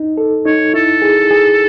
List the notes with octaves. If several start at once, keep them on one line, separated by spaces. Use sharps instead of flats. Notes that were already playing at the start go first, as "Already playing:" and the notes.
Already playing: D#4
A4
D#4 C#5
E4 A4
G#4
G#4